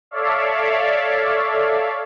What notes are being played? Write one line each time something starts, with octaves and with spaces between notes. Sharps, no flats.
A4 C#5 D5 E5 F5